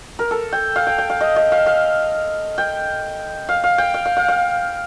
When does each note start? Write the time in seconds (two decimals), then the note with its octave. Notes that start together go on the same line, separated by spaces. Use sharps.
0.19 A#4
0.31 A4
0.52 G5
0.76 F5
0.87 G5
0.98 G5
1.10 F5
1.21 D#5
1.36 D#5
1.52 F5
1.66 F5
2.58 G5
3.49 F5
3.64 F5
3.78 G5
3.94 F5
4.05 F5
4.17 F5
4.28 F5